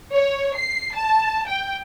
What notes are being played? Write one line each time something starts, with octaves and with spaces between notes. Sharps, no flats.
C#5
C7
A5
G5